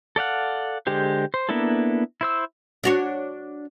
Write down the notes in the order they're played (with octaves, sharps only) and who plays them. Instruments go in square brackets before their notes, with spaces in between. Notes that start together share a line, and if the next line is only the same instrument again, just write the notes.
[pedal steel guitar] A4 D5 F5 F#5
D3 G#3 G4 C5
C5
A#3 B3 D4 E4 A4
E4 C5 E6
[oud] D4 F#4 C#5